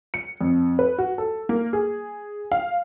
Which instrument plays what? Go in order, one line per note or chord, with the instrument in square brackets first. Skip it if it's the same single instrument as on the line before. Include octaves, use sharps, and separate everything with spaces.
[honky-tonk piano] C#7
F2
B4
F#4
A4
A#3
G#4
F5